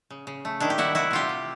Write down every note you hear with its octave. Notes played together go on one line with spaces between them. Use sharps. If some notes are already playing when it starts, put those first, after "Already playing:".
C#3
C#3
A3
D#3 D4 E4
G4
G3 E4 F#4
C3 E4 F#4
C3 F4 G4
C3